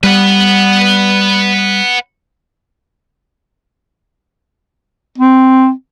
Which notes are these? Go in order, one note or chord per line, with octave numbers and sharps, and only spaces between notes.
G3 B4 F#5
C4